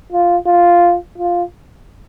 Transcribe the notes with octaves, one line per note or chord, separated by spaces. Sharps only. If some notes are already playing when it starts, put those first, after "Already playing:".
F4
F4
F4